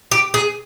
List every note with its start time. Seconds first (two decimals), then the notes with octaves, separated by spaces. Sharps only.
0.11 G4
0.34 G#4